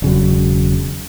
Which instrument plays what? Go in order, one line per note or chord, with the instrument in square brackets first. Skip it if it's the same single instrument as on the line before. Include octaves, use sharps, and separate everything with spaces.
[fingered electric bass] E1 C#3 F#3